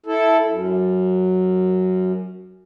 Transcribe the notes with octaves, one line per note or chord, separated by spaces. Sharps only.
E4 A4
F#2